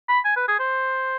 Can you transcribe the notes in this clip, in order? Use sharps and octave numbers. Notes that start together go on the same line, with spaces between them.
B5
G#5
B4
G#4
C5